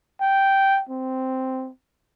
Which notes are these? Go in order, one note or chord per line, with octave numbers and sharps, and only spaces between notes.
G5
C4